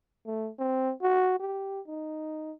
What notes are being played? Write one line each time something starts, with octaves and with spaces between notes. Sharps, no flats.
A3
C4
F#4
G4
D#4